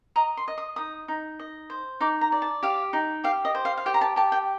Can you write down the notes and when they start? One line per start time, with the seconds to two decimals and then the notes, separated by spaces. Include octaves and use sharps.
0.16 D#5 A#5
0.37 C6
0.48 D#5
0.58 D#6
0.76 D#4 D#6
1.08 D#4
1.39 D#5
1.70 C5
2.01 D#4 D6
2.21 A#5
2.32 D5
2.42 A5
2.63 G4 F5
2.93 D#4
3.24 G4 F5
3.45 D#5
3.55 C5
3.65 F5
3.77 F5
3.86 G4 G5
3.94 A#5
4.01 A5
4.16 G4 A5
4.32 G5